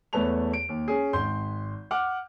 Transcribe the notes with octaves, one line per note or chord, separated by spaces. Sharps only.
E2 A3 B4 C#5 A5 F7
D7
D#2
C#4 G#4
G#1 C6 G6
F#5 D6 F6